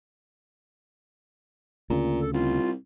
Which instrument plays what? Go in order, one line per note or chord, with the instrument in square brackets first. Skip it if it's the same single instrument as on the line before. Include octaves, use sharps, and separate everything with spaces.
[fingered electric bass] D2 C#3 [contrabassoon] A#2
[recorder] A4
[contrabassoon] C2 [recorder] F4